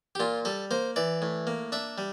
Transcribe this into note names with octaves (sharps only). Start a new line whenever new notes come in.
G4
A#2 F4
G3 A4
A#3 C5
E3 D5
A2
A#3
D4 E5
G3